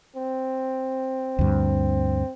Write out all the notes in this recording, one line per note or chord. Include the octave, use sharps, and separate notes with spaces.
C4
D2 G2